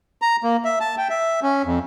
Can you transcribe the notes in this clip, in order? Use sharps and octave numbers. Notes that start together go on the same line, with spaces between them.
A#5
A#3
E5
A5
G5
E5
C#4
F2